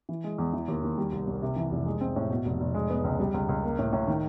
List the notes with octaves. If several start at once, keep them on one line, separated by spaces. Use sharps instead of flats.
E3
G#3
E2
E3
D#2
D#2
G3
C2
C2
C3
E3
F1
G#3
C4
A2
B2
F1
F1
G#3
B3
C#2
G3
C#2
C#2
A#3
A2
A2
D#3